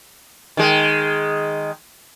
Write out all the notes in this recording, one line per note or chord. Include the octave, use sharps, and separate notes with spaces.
D#3 G#3